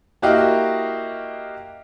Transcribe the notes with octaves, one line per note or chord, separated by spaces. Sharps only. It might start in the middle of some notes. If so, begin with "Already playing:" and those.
A#3 E4 F#4 G4 D#5 F5